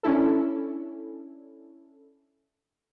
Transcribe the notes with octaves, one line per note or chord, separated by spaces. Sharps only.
C#4 D4 E4 A4